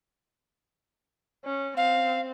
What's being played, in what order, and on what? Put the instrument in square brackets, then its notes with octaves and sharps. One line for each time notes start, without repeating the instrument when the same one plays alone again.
[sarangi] C#4
[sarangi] C4 [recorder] F5